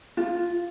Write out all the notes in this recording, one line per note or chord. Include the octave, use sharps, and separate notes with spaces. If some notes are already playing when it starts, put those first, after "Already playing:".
F4